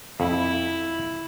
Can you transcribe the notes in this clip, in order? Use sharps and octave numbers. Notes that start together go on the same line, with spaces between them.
F2 E4